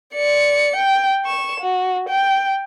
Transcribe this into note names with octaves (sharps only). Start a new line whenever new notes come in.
D5 C#7
G5
C#6 E7
F#4
G5